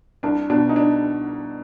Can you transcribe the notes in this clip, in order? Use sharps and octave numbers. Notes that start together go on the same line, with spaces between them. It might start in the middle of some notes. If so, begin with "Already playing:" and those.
C2 D4
B2 D4
D#4
D4